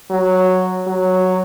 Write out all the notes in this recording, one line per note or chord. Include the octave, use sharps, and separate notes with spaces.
F#3
F#3